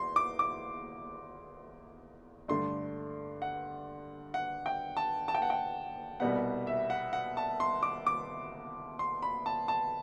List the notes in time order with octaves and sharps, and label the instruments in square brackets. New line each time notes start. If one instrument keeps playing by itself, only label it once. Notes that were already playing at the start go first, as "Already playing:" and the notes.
Already playing: [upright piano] E2 C6
D6
D6
G2 D3 A3 D4 C6
F#5
F#5
G5
A5
A5
G5
F#5
G5
C2 B2 G3 B3 F#5
E5
F#5
F#5
A5
C6
D6
D6
C6
B5
A5
A5